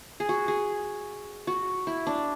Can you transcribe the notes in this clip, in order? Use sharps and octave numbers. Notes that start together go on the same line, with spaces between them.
G#4
F#4
G#4
F#4
E4
D4